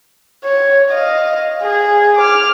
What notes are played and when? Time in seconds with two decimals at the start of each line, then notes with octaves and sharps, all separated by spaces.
0.44 C#5
0.90 D#5 F5
1.62 G#4
2.17 D6 F6